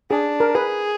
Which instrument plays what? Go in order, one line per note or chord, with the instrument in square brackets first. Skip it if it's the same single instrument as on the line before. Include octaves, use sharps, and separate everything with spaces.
[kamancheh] D4 [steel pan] G#4
[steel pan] A#4
[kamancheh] G#4 [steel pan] B4